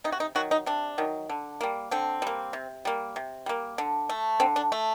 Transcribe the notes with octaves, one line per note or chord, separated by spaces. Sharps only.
C3 D#4
F#4
D#4
D#3 F#3 F#4
D#4
C3 D4
D#3 F#3
D3
G3 A#3
D3 C4
G3 A#3
C3
G3 A#3
C3
G3 A#3
D3
A3
D3 C4
D4
A3